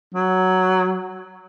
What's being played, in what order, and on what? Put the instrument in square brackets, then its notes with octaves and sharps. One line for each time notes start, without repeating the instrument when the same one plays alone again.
[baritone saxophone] F#3